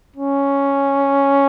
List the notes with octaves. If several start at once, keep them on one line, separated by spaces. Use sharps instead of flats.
C#4